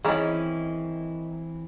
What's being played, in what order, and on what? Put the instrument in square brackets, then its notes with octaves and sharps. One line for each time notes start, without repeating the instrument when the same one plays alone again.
[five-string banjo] D#3 C#4 [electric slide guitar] E3 C4 E4 [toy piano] G#4 D#5